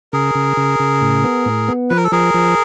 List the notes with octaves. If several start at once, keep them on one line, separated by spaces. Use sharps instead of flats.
C#3 G#4 A#4
C#3
C#3
C#3
A2
B3
A2
B3
F3 B4
A#4
A4
F3 G#4 A#4
F3